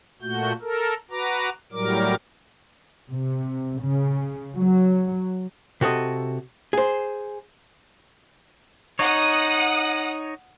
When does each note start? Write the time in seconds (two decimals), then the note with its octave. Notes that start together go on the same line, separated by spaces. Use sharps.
0.22 A#2 A3 F#4 G6
0.62 A4 A#4
1.11 F#4 B4 A#5 D6
1.72 A2 F#3 G3 A#4 D6
3.10 C3
3.81 C#3
4.55 F#3
5.81 C3 F#4 A4 D#5
6.73 G#4 C5
8.99 D#4 C#5 F#5 D#6